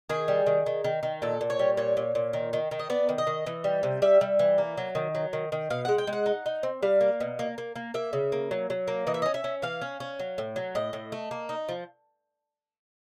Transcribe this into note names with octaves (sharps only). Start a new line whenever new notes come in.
D#3 G#4
G3
D#3
D#3
D#3
D#3
A#2 A4
A#2
C#5
G3
A#2 C#5
A#2
A#2
D#3
D#3
D#3
D#5
B3 D5
D#3
D#5
D#3
E3
G3
C3
G3 E5
G3
E3
A#3
F#3
D#3
F#3
D#3
D#3
B2 F5
G#3 F#5
G5
G#3
F#5
D#4
D#4
C4
G3 F5
A#3
B2
A#3
A#3
A#3
A#3 E5
C#3
A#3
F#3
F#3
A#3
E3 D#5
E5
C#4 D#5
E5
C#4
E3 F5
C#4
C#4
F#3
A2
F#3
A2 D#5
A2
A3
A#3
D#4
F3